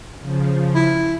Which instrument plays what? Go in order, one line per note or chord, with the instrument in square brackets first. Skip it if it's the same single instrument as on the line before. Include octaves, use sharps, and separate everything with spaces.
[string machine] C#3 F3
[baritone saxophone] E4